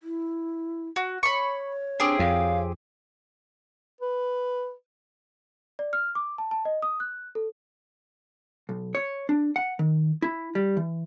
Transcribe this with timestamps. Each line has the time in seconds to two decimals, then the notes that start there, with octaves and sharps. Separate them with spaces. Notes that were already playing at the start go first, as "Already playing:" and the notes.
0.03 E4
0.96 F#4
1.23 C#5 B5 C#6
2.00 C4 D4 G4 G#4
2.19 F2 F5
4.01 B4
5.79 D5
5.93 F6
6.15 D6
6.38 A5
6.51 A5
6.65 D#5
6.82 D#6
7.00 F#6
7.35 A4
8.69 B1
8.95 C#5
9.29 D4
9.56 F#5
9.79 D#3
10.22 E4
10.55 G3
10.77 E3